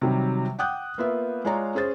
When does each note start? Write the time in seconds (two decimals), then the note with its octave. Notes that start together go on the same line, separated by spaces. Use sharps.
0.01 C3 D#3 F#3 G3
0.59 F#5 G5 D6 D#6 F#6 G6
0.98 A#3 B3 F4 B4 E5
1.45 G#3 F4 C#5 D5 A#5 C#6
1.75 C#4 G#4 C5 A6